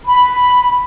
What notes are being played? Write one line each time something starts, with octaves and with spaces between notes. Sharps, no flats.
B5